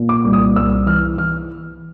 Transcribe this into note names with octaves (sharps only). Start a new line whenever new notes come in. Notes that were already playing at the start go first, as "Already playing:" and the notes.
Already playing: A#2
D6
C2
D#6
C2 E6
E3 F6
E3 F6